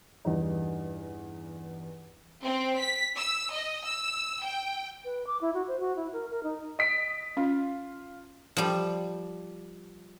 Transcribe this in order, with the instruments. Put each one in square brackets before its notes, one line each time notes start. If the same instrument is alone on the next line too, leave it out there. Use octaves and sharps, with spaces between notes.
[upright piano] E2 G2 D#4
[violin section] C4
B6
E6
D#5
E6
G5
[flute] B4
D6
E4
F#4
C5
F#4
E4
A#4
A#4
D#4
[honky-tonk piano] D#5 B6 D7
[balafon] C#4 [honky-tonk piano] F4
[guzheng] F3 G3